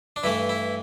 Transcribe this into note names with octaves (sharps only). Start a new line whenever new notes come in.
D4
G2 E3 A3 E4
E4